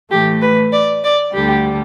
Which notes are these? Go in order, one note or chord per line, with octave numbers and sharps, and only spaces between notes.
A2 E3 A3 G4
B4
D5
D5
D2 D3 G3 G4